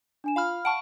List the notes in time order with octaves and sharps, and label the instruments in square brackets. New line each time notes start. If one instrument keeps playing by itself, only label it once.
[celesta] D4 G#5 E7
[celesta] F4 [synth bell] F5 B5 F6
[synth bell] F#5 A5 C#6 [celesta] D7